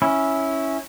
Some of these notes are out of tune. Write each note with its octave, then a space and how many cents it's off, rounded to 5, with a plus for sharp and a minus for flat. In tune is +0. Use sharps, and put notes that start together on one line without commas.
C#4 -5 E4 -10